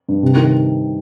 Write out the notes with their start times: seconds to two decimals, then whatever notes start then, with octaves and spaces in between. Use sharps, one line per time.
0.09 G2
0.23 C3
0.37 D#3